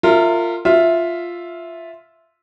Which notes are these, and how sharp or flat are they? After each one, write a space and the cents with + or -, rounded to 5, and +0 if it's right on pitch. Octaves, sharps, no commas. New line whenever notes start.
F4 +0 A#4 -30 E5 +0
F4 +0 E5 +0